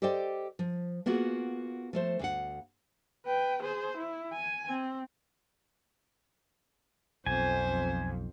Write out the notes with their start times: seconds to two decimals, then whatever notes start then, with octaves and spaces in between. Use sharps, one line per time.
0.02 G4 A4 C5 D5 D#5 G5
0.59 F3
1.06 A#3 B3 F4 F#4 G#4
1.93 F3 A3 C5
2.19 D2 F5 F#5
3.26 B4 G5
3.62 G#4 C5
3.97 E4
4.33 G#5
4.68 C4
7.26 B1 F2 C5 G#5